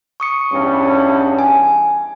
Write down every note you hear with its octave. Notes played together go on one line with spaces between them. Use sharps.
C#6 D#6 C#7
E2 G2 C#4
G#5